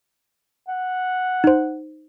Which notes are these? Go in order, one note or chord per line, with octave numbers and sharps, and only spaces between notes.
F#5
D#4 C5